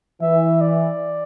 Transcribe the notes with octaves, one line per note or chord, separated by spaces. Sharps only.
E3 E5
D5